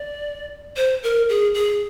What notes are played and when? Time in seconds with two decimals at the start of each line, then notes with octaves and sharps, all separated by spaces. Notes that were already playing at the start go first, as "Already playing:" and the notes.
Already playing: D5
0.77 C5
1.03 A#4
1.29 G#4
1.54 G#4